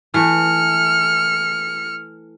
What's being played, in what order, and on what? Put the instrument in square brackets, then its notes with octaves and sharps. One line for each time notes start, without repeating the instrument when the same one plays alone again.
[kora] E3 A3 [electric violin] F6 C#7